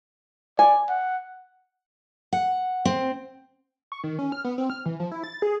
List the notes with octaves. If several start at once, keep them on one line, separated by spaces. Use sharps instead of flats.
D5 G#5
F#5
F#5
C4
C#6
D#3
C#4
F6
B3
C4
F6
E3
F3
E4
A6
G#4